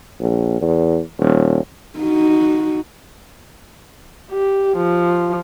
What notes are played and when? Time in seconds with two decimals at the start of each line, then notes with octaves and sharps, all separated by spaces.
0.20 A#1
0.61 E2
1.19 D#1
1.99 D#4 F#4
4.31 G4
4.77 F3